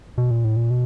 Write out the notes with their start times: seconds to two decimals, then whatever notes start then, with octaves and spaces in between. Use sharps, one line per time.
0.18 B2
0.31 A#2
0.44 A2
0.56 A#2
0.70 B2